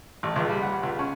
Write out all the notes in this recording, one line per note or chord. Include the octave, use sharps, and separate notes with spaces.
A1
C#2
G3
F#5
C#2
C#4